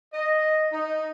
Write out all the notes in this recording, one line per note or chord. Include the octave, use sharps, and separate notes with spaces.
D#5
D#4